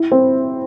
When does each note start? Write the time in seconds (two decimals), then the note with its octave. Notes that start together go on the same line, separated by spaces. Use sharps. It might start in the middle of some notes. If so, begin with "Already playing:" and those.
Already playing: E4
0.12 C4